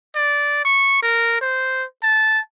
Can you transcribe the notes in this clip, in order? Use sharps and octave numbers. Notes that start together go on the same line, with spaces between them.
D5
C#6
A#4
C5
A5